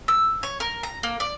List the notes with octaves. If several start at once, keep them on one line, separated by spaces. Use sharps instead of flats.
E6
C#5
A#4
A#5
A#3
D5